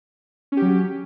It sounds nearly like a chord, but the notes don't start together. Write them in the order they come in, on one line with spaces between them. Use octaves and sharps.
C#4 G4 F#3